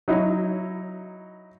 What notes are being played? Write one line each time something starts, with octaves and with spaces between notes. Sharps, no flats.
F#3 D#4 E4 C#5